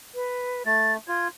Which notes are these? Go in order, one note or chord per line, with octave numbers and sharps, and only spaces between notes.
B4
A3 A6
F4 G#6